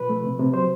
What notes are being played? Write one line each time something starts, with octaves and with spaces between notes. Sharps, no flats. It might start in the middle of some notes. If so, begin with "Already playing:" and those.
Already playing: B2 F3 B4
A3
C3
C3
F#3 C5